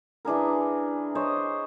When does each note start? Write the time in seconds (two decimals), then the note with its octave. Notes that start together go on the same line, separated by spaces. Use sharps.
0.25 E3 D4 G#4 A#4
1.15 C5 C#5 D#5